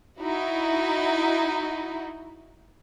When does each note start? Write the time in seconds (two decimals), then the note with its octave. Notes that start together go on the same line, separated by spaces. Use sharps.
0.18 D#4 E4 F#4